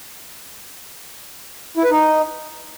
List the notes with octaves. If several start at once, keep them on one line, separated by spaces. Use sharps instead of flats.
E4
B4
D#4